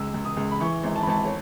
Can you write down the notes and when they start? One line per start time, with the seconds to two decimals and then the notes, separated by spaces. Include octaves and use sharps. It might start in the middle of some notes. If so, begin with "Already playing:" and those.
Already playing: C#2 E6
0.14 C#2
0.25 D#6
0.37 C#2
0.51 B5
0.60 E3 C#6
0.84 G#1
0.96 A5
1.03 B5
1.07 G#1 A5
1.25 C#5